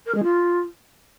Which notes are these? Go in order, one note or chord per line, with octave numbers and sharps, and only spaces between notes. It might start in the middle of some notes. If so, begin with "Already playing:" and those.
A#4
G#3
F4